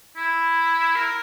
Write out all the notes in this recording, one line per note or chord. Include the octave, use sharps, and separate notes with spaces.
E4
A#4